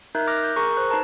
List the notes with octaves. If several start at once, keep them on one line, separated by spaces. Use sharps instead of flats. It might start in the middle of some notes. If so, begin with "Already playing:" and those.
D#4 A#4 E5 F#6 G6
D6 F6 F#6 A#6
G6
G#4 A#4 A#5 C#6
C5 F#6
D#4 B4 A5 A#5